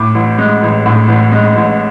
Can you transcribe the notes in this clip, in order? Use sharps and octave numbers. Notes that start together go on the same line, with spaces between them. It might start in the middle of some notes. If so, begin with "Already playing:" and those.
Already playing: A2 D6
A1
G#3
A1
A2
A1
G#3
A1